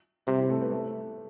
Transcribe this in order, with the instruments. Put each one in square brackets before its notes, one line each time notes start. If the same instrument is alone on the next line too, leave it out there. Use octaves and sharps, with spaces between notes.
[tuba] C3 [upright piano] G3 G4
[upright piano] E4
A3 A4
B3 B4
A3 A4